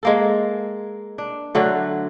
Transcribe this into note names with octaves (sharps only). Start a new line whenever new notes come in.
G#3 A#3 A4
D4
D3 F#3 A3